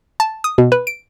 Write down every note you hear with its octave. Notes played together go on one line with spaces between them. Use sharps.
A5
D#6
B2
B4
D7